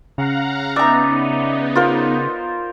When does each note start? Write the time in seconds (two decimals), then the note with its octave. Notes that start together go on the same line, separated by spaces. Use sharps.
0.18 C#3 F5 F#5 A#5
0.76 B3 D#4 D5 E5 A#5
1.75 F4 A#4 C5